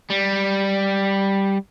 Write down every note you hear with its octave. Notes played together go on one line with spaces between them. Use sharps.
G3